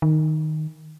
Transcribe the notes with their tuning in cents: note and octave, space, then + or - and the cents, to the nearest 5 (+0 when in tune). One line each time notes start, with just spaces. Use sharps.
D#3 -5